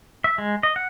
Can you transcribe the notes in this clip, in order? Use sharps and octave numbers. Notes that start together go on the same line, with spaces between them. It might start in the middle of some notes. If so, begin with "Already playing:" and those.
E5
G#3
D#5
F#5